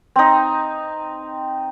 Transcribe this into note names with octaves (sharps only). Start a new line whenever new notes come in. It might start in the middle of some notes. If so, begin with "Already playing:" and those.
C4 D#4